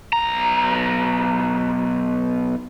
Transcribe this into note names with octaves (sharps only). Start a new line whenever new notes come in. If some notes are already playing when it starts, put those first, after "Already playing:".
B1 A#5